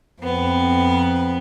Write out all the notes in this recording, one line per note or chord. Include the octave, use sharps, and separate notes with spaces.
F2 B3 C4